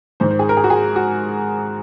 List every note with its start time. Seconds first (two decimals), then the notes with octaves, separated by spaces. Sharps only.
0.20 G#2 D#3 C5
0.31 C5
0.39 G#4
0.49 A#4
0.57 G#4
0.64 F#4
0.70 G#4
0.96 F#4